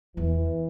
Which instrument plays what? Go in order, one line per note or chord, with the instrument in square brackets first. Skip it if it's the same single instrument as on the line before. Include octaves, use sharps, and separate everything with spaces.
[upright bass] E2 [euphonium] E3